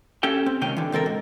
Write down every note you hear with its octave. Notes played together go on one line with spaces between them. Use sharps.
C#4 G4 A4 G5
C4
C#2 C3 D#3 C#4 G5
D3 E3
C#2 C4 A4 A#4
G#2